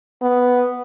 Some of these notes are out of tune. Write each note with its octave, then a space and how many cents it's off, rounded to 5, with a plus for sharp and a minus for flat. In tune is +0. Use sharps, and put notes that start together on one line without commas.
B3 +0